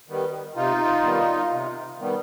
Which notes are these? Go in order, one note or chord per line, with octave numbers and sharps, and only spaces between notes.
D#3 G3 B3
C3 D#4 F4
D#3 G3 B3
C3
D#3 G3 B3